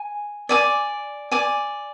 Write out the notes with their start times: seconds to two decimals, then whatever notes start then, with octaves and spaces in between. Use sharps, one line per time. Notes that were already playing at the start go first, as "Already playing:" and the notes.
Already playing: G#5
0.49 D5 G#5 D6
1.31 D5 G#5 D6